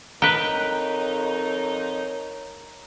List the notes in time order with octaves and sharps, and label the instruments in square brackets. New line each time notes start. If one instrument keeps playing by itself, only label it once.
[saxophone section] F2 D#4 [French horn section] A#4 C#5 [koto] B4 G5 [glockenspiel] A#5